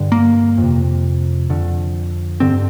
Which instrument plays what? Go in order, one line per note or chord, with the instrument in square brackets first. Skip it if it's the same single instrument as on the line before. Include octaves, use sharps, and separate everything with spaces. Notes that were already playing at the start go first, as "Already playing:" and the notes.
Already playing: [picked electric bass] G2 D3
A#3
F2 C3
F2 D3
G2 D3 C4